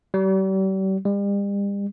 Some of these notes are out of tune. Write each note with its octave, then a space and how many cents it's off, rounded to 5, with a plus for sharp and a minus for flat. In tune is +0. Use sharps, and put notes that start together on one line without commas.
G3 -40
G3 +40